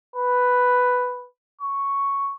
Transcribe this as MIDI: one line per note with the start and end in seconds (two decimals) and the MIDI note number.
0.15 1.27 71
1.61 2.36 85